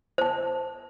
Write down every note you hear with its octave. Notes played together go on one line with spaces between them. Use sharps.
C5 A5